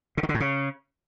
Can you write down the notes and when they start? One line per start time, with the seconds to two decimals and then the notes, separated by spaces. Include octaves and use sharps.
0.17 C#3
0.23 D#3
0.29 D3
0.35 A2
0.40 C#3